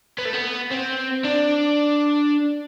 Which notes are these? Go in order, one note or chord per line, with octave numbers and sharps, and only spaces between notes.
B3
A3
B3
C4
D4